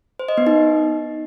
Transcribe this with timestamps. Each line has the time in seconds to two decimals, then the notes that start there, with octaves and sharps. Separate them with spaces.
0.19 C5
0.29 D#5
0.38 B3
0.47 D#4